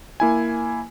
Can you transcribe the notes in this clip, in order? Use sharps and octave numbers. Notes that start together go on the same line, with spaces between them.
A#3 E4 G#5